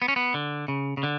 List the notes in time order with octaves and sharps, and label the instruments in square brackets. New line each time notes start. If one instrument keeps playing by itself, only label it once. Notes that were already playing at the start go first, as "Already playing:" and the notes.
[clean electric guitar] B3
C#4
B3
D3
C#3
C#3
D3